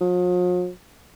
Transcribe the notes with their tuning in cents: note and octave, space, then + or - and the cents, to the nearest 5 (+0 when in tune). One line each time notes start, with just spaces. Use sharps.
F3 +45